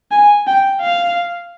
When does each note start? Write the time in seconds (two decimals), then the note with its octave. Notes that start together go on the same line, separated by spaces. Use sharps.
0.11 G#5
0.47 G5
0.81 F5